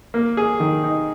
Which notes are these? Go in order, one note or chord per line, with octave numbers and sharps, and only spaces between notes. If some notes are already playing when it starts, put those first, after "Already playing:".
A#3
G#4
D#3
D#4